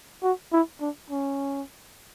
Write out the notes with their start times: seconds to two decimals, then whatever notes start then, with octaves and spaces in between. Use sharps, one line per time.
0.23 F#4
0.52 E4
0.81 D4
1.10 C#4